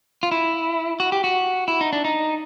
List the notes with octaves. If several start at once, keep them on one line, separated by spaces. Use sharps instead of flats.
F4
E4
F#4
G4
F#4
E4
D#4
D4
D#4